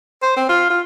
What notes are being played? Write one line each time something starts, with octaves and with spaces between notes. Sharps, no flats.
C5
C4
F4
F4